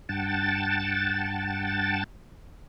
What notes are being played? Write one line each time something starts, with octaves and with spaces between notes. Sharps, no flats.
G2 F#5 G5 A5 A6